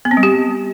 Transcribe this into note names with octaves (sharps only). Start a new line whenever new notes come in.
B3
C4
G3
G4